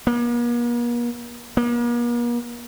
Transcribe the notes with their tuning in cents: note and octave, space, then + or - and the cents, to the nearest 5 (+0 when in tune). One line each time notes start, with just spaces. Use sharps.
A#3 +45
A#3 +45